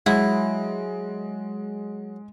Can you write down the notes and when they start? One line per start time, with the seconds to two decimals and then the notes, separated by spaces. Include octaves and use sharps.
0.06 F#3 G#3 E4 F#5